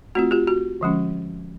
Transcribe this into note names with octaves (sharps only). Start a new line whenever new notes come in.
A3 C4 F4 F#4
F4 G4
F#4
D3 F3 G#3 C#4